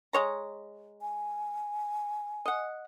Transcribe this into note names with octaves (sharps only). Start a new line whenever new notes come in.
G#3 C#5 A#5
G#5
D#5 F#5